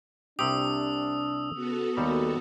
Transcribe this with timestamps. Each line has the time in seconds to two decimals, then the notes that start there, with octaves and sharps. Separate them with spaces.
0.39 C2 C3 D4 G4 D#6 E6
1.54 C#3 B3 F#4 A4
1.97 D#2 G3 A#3 A#5